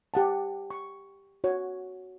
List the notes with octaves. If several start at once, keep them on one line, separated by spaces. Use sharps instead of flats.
G4 F#5 A5
C#6
F#4 C#5